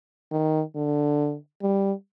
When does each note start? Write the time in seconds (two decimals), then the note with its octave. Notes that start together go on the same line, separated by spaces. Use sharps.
0.31 D#3
0.75 D3
1.62 G3